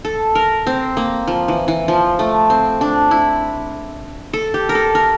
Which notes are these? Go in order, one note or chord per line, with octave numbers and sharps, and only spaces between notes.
A4
A#4
C4
A#3
F3
E3
E3
F3
A3
C4
D4
E4
A4
G4
A#4
A4
A#4